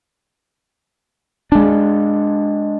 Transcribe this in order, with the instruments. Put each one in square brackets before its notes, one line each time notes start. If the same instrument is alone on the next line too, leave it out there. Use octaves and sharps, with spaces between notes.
[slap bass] G#3 D4